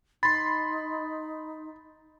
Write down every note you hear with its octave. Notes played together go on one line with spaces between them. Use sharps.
D#4 B5 C6 A6